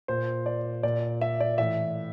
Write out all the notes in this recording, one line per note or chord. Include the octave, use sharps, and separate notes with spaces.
A#2 C5
D5
A#2 D5
E5
D5
A2 E3 E5